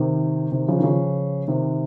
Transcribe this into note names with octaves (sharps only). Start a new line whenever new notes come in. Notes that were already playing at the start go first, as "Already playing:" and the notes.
Already playing: C3 D#3
C3 D#3
C#3 F3
D#3
C#3 F3
C3 D#3